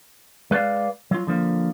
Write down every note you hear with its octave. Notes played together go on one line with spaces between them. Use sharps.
G#3 B4 C5 D5 F5
F#3 F4
D3 F3 A#3